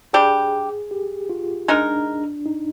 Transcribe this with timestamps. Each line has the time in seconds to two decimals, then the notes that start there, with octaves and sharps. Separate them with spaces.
0.13 G3 D4 G4 G#4
0.91 G4
1.30 F4
1.68 G#3 D4 D#4 A#4
2.46 D#4